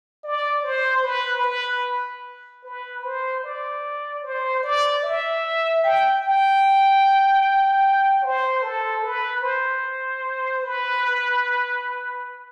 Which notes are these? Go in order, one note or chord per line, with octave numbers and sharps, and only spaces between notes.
D5
C5
B4
B4
B4
C5
D5
C5
D5
E5
G5
G5
C5
A4
B4
C5
B4